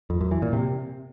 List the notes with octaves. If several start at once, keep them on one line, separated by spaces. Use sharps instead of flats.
F2
F#2
E3
A#2
C3